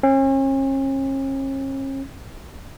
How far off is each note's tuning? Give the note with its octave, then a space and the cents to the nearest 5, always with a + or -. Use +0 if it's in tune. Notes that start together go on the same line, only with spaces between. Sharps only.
C#4 -40